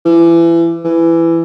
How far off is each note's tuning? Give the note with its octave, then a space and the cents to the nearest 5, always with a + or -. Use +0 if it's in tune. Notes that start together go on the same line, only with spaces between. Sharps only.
E3 +30
E3 +15